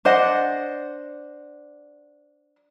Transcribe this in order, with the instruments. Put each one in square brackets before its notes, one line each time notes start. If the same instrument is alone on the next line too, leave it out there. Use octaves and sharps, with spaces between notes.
[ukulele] D4 C5 D#5 F#5